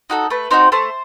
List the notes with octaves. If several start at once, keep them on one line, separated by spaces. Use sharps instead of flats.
D#4 F#4 A4
A3 B4
C4 D#4 F#4 C5
A3 C5